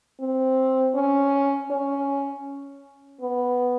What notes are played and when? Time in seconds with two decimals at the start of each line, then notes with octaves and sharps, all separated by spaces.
0.20 C4
0.95 C#4
1.71 C#4
3.21 B3